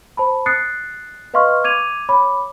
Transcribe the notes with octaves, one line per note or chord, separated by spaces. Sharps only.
C5 A5 B5
D#6 F#6 A6 C7 C#7
B4 D#5 F5 C6 C#6 F6
D6 G#6 D#7 F7
C#5 B5 D6